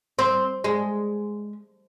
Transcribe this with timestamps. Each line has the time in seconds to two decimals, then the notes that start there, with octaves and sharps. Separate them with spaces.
0.19 C4
0.64 G#3